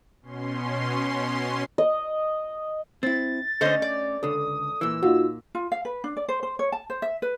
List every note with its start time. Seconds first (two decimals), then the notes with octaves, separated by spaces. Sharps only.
0.22 B2 C#4 C6
1.78 D#5
3.03 C4 E4 A6
3.61 D3 A3 C#4 C5 D#5
3.82 D5
4.23 C#2 D3 A4 D#6
4.81 A#2 E3 E6
5.03 A#2 D#4 F4 F#4
5.55 F4
5.72 F5
5.85 B4
6.04 D4
6.17 D5
6.29 C5
6.43 C5
6.59 C#5
6.72 A5
6.90 C5
7.02 E5
7.22 B4